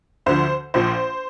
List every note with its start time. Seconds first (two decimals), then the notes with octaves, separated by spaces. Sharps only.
0.26 D2 D3 F3 C5
0.74 A#1 A#2 F3 C5